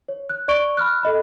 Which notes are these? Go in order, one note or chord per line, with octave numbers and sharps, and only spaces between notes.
C#5
F#6
D5 C#6 D7 G7
B5 F6 F#6
A4 D#5 B5